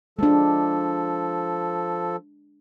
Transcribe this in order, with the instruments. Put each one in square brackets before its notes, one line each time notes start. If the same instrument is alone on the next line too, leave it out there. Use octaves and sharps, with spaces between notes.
[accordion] F3 A4 [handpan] G#3 D4